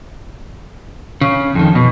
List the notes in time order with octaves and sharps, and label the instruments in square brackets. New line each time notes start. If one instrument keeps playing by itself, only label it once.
[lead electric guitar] C#3
F2 D#3
B2